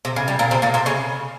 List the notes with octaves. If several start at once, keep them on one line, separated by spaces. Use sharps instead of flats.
C3
C#3
G3
A#2 A#3
C3 C4
A#2 A#3
C3 C4
C#3 C#4